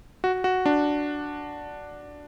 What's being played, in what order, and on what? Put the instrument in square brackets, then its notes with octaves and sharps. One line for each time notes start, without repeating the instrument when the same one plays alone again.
[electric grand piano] F#4
F#4
D4